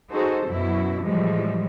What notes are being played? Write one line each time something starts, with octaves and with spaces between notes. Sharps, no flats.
D#4 F#4 G#4 A4 C5
F#2 B2 F#3 E4
A2 E3 F3 G3 G#3